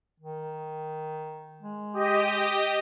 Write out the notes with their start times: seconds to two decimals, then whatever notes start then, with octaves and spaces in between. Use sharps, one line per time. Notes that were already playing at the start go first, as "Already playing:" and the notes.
0.20 D#3
1.62 G#3
1.94 G4 D#5